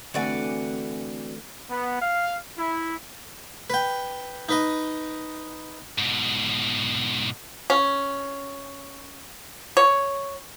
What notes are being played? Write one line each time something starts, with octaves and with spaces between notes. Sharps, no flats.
D3 E3 A3 C4 F#4 D5 F#5 G#5
B3
F5
E4
B4 G5
D#4 B4 D#5
G#2 B2
C#4
C#5